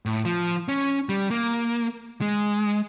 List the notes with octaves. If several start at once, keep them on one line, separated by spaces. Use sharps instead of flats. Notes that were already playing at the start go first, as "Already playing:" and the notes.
A2
F3
C#4
G3
A#3
G#3